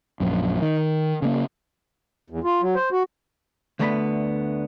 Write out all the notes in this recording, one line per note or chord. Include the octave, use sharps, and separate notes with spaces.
A#1 F#2
D#3
C#3 A#3
E2
F4
F#3
C5
F#4
D2 D3 A3 B3 A#5 B5